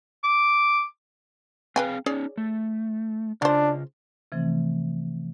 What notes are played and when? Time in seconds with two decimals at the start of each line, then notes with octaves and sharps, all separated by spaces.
0.24 D6
1.76 C4 G#4 B4 F5 G5 G#5
2.06 C#4 D#4 G#4 C#5 D5
2.37 A3
3.42 C#3 G#3 D4 F4 C5
4.32 C3 E3 F3 A3 C4